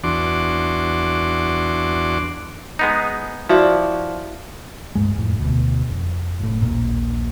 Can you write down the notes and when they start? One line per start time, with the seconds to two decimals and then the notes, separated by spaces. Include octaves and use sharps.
0.04 E2 D4 F#4 C6 D6
2.79 G#3 B3 D#4
3.49 F3 E4 F#4 D5
4.95 D1 C2 G2 G#3
5.16 F1 A2
5.40 D2 B2
5.89 F1
6.39 F#1 A2
6.62 D#1 A#1 A#2